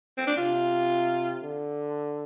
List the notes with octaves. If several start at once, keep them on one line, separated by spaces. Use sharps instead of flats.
C4
D4
C3 F4
D3